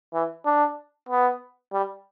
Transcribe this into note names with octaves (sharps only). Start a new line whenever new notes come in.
E3
D4
B3
G3